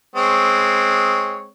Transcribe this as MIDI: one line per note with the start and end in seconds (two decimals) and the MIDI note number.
0.16 1.49 56
0.16 1.49 60
0.16 1.49 73